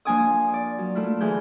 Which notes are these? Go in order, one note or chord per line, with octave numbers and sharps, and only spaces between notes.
F3 A#3 D4 G#5 D6 D#6
D5
F#3
A3 E4 F4
D2 E3 G#4 G6